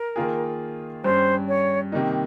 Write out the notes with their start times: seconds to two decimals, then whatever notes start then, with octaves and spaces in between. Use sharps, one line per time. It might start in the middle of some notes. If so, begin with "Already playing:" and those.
Already playing: A#4
0.16 D#3 A#3 F4 G#4
1.04 G2 G3 C#4 C5
1.48 C#5
1.92 C3 D#3 G3 A#3 D#4